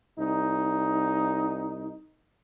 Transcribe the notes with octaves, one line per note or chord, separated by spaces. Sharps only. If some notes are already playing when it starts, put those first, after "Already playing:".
C2 D#4